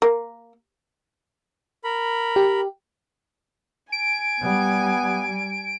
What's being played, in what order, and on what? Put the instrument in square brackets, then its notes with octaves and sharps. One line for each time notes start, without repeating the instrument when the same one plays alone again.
[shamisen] A#3
[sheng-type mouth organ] A#4 B5
[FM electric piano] G4
[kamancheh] G#5 [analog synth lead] D7
[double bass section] G3 [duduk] B3